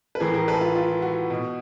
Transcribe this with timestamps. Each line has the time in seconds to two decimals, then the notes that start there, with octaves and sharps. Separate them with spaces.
0.15 B4
0.20 A2 E3 G#4 A#4
0.34 G#4 A#4
0.48 A4 B4
0.61 F4
0.75 F4
1.02 F#4
1.30 B2